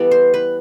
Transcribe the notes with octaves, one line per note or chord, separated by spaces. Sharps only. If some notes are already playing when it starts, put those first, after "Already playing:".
Already playing: E3 G3 B3 G4 A4 D5
C5
B4